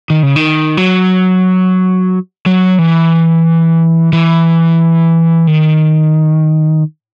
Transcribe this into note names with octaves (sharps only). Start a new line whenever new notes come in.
D#3
C#3
D#3
F#3
F#3
E3
E3
D#3